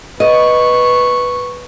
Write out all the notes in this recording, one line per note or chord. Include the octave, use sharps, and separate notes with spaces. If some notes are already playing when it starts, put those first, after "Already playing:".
B4 D#5 C#6